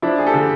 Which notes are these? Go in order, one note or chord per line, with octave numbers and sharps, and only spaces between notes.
F3 D4 E4
G#4
G4 A4
D3